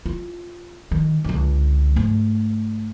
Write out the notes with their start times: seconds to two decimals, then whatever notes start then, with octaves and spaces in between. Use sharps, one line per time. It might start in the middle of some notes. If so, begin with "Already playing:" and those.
0.06 F4
0.91 D#3
1.25 C#2 D3
1.96 G#2 A3